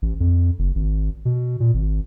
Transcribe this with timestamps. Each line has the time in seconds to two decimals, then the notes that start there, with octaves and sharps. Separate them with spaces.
0.02 A1
0.20 F2
0.59 F#1
0.75 G#1
1.25 B2
1.60 A#2
1.74 G#1